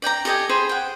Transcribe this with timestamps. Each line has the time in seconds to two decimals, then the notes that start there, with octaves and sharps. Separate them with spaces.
0.02 D5 G5 G#5 A#5
0.25 G4 A4 D#5 G#5
0.49 G#4 C5 B5
0.69 F#5 G5